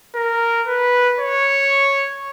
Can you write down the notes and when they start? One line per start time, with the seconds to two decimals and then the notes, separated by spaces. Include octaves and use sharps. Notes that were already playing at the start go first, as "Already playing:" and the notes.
0.15 A#4
0.67 B4
1.19 C#5